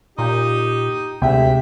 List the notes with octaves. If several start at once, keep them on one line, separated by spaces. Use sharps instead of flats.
A#2 D#4 G4
D2 G#2 C3 E5 G5